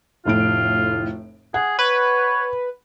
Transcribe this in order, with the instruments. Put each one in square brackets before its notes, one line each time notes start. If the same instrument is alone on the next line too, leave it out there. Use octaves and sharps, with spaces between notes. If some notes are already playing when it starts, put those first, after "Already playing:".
[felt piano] F1 A2 D7 [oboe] F4
[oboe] G#4 [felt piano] F#5
[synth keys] B4 [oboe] C#5